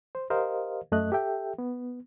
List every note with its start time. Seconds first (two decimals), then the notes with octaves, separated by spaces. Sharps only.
0.15 C5
0.30 G4 A#4 C5 D#5 F5
0.92 F#2 A3 D#5 F#6
1.12 G4 A4 E5 G5
1.58 B3